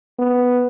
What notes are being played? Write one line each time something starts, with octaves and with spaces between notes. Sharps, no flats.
B3